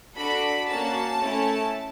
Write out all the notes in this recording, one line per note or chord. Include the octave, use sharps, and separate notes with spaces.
D4 F#4 A4 B5
A#3 C#4 F#4 A5
A3 C#4 E4